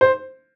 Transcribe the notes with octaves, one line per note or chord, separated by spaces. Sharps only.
C5